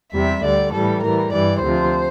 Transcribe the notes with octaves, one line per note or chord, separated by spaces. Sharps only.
E2 C3 G3 E5
D2 D3 G3 D5
A2 E3 G3 A4
A2 E3 G3 A#4
G2 E3 G3 D5
D2 C3 F3 C5